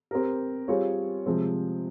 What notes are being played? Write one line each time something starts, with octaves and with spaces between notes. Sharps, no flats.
C4 G4 A#4
G3 C4 F4 G#4 C#5
C3 F3 G#3 C4